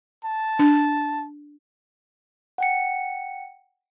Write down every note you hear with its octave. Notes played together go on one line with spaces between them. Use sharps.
A5
D4
F#5 G5 C#7